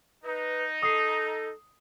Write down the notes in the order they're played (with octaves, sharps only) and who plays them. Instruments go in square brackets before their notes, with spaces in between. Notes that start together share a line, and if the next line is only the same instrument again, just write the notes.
[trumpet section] D#4 [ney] B4
[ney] A4 [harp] D#6 C7